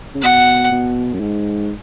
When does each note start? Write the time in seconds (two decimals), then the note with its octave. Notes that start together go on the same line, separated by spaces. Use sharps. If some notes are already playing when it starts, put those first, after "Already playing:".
0.15 C#3
0.22 B2 F#5
0.72 B2
1.14 F#2
1.20 G#2